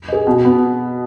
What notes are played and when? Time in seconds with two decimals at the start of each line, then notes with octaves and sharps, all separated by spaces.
0.08 G#4 D#5
0.27 B2
0.45 B3